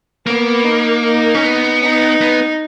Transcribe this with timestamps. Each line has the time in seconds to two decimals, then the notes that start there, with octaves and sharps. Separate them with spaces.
0.26 A#3 B3
0.65 D#4
1.04 D#4
1.35 C#4
1.43 B3
1.82 D#4
2.21 B3